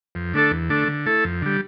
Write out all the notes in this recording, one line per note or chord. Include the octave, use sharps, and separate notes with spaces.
F2
D3 A3 D4 A4
E2
D3 A3 D4
D3
A3 E4 A4
F2
D3 G3